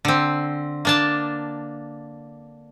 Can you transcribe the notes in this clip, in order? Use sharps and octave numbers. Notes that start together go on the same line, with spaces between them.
D3 C4
A#3 D4 A5